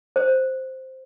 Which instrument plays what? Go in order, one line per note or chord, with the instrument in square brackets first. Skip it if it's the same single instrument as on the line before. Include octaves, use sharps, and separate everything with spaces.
[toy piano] C5